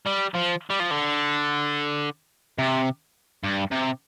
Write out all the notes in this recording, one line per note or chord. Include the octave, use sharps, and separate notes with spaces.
G3
F3
G3
F3
D3
C3
G2
C3